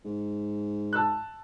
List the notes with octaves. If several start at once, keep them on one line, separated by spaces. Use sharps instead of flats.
G#2
A5 E6 F#6